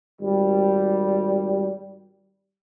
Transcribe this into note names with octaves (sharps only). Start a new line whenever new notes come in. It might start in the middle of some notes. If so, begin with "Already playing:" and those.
G#1 G3